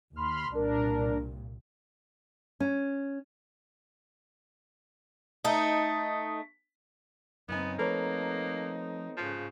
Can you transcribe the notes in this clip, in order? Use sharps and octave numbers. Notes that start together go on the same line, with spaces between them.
D#2 B5 C6 F6
C2 A#2 D4 A#4
C#4
A3 D#4
F#2 C#3 B3 C4 D#4 G#5
F3 A3 A#3 A4 B4 C#5 A#5
G#2 C#3 F3